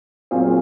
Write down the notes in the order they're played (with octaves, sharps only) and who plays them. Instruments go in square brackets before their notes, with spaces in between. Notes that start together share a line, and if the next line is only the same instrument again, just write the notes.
[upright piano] A#2 F#3 C4 F4 G#4